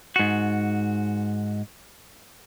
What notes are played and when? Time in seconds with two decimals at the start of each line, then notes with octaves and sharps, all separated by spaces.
0.16 G#2 F#4